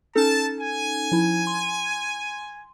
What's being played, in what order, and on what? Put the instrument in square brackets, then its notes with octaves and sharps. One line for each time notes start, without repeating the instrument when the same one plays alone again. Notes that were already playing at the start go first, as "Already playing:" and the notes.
[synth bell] C#4 D#4 A4 [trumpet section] A5
[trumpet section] G#5
[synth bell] F3 E4
C6